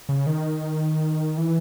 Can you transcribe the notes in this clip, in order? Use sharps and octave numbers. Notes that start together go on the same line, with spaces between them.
C#3
D#3
E3